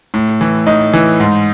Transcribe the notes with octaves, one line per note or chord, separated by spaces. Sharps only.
A2
E3
A2 D#4
E3
G#2